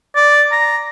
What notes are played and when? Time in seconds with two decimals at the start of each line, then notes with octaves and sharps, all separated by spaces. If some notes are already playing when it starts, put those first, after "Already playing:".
0.16 D5
0.52 A#5